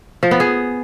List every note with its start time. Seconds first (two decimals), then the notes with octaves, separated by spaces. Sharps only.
0.23 F3
0.31 B3
0.40 G#4